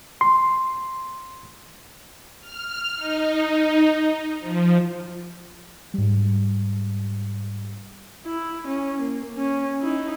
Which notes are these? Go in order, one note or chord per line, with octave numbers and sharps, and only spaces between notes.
C6
F6
D#4
F3
G#2 G3
E4
C#4
A#3
C#4
D#4 E4